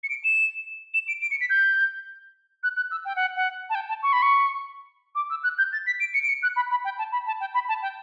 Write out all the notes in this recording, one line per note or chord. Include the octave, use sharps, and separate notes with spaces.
C#7
D7
E7
E7
D7
D7
C#7
B6
G6
F#6
F#6
E6
G5
F#5
F#5
A5
G5
A5
C#6
B5
C#6
D6
E6
F#6
G6
A6
B6
D7
C#7
D7
C#7
F#6
B5
B5
G5
A5
B5
A5
G5
B5
A5
G5